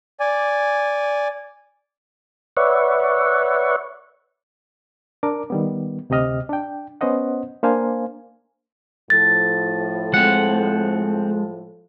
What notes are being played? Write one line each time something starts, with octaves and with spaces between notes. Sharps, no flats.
D5 G#5
B4 C#5 D5 E5 F#5 C#6
D4 A#4 D6
D#3 G3 B3
D2 C3 G4 D#5 F6
D4 G5
B3 C#4 C5 D#5 F#5
A#3 D4 C5 F5 G#5
A2 F3 A4 A6
G#3 C4 F#5